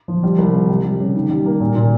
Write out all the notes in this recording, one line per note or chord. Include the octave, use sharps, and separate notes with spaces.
F3
G3
C2
C3
G3
G3
C#3
D#3
G3
A#3
A#2
A#2